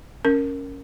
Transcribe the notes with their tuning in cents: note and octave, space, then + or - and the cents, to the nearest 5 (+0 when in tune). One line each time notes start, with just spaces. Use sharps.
C#4 +0 A#4 -5